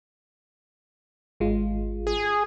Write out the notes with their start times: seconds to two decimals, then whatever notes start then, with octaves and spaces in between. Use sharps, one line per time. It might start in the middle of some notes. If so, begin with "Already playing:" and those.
1.40 G#1 G#3 F4
2.07 G#4